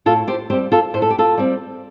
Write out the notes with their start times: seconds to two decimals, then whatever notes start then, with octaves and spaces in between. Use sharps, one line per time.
0.06 A2 F4 A4
0.28 G4 C5
0.50 G3 C4 G4 C5
0.72 F4 A4
0.94 A2 C5
1.02 A4
1.10 G4
1.18 F4 A4
1.38 G3 C4